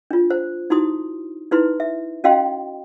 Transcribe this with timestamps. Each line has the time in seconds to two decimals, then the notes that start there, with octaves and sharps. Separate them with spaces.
0.11 D4 F4
0.30 C5
0.70 D#4 E4 F#4 C6 D#6
1.51 D#4 E4 B4 C6
1.80 E5
2.24 C#4 F#4 D#5 F5 G5 C6